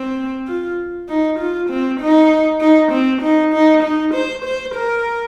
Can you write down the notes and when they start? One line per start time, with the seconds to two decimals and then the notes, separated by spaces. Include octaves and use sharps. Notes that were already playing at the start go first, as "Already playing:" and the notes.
Already playing: C4
0.48 F4
1.09 D#4
1.39 F4
1.70 C4
2.00 D#4
2.61 D#4
2.92 C4
3.22 D#4
3.53 D#4
3.83 D#4
4.14 C5
4.45 C5
4.75 A#4